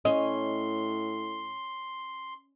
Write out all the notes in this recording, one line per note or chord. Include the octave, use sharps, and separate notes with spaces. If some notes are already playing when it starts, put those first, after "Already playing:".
A2 C#4 D#5 C6